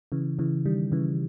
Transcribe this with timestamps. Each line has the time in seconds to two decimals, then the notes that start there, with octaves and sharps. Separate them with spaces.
0.12 C#3 E3
0.39 C#3 E3
0.66 D#3 G3
0.92 C#3 E3